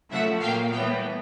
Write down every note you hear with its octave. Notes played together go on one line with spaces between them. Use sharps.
C#3 F3 A3 E5 F#5
A#2 F#3 A#3 F5 G5
A2 E3 G3 B3 F5 G5